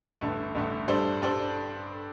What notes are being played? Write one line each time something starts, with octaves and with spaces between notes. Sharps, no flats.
A1 G2 D3 A3
A1 G2 D3 A3
G2 G3 D4 A4 C5
G2 G3 D4 A4 C5